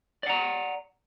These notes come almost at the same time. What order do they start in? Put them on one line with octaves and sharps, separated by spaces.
D5 F#5 A#5